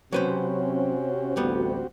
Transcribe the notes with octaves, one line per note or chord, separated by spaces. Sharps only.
C3 F#3 C4 C#4 F#4 G4 B4 C5
A1 D2 G3 B3